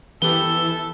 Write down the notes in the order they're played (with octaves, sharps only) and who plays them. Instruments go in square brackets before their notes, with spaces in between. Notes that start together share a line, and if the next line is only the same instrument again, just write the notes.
[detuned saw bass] E3 [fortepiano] B3 G4 [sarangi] A4 [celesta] G7